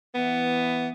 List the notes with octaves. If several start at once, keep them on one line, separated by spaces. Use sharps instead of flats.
E3 B3